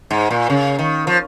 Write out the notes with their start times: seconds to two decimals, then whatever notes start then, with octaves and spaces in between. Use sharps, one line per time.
0.11 G#2
0.31 A#2
0.50 C#3
0.79 D#3
1.07 F3